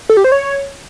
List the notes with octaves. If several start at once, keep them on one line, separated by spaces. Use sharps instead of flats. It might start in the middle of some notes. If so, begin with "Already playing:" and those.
A4
G4
C5
C#5